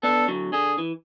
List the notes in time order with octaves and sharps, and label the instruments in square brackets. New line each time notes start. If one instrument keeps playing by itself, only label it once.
[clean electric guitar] B3 D4 [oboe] A4
[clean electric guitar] D3 F#3
[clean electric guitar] D3 [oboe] G#4
[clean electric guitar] E3